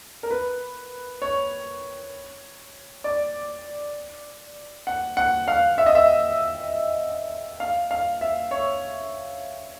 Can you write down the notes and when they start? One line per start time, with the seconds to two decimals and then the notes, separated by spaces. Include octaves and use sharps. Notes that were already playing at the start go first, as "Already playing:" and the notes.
0.23 A#4
0.31 B4
1.22 C#5
3.04 D5
4.87 F#5
5.17 F#5
5.48 F5
5.78 E5
5.86 D#5
5.95 E5
7.60 F5
7.91 F5
8.21 E5
8.51 C#5